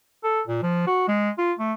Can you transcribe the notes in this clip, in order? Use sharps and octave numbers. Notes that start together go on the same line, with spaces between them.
A4
A#2
F3
F#4
G#3
F4
A3